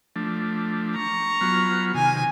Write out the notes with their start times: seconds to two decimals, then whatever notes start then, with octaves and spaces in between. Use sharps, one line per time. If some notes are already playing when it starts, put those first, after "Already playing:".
0.16 F3 A3 D4
0.95 A#5 C#6
1.41 F#3 B3 F4
1.95 C3 D#3 G#5